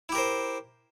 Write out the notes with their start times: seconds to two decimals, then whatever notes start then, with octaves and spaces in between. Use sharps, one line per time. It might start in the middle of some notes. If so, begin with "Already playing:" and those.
0.09 E4
0.12 G4
0.15 A#4
0.18 C5